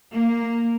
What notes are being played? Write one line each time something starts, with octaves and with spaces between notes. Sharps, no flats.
A#3